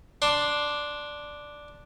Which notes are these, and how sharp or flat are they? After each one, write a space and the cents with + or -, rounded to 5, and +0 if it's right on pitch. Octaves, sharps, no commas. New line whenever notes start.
D4 +0 C6 +0